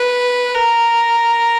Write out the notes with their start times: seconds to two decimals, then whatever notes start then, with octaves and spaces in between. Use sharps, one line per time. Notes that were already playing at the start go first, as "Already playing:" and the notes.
Already playing: B4
0.54 A#4